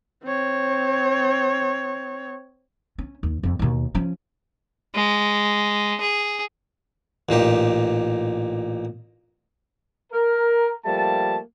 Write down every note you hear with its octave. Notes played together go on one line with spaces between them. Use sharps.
C4 C#5
C#4
D#2
F2 F3
D#2 B2
F3 C#4
G#3
G#4
A1 A#2 D#4 G4
A#4
F3 G3 A3 A#3 A5